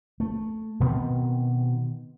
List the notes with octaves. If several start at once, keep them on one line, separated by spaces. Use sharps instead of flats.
A3
B2 D#3 B3 C4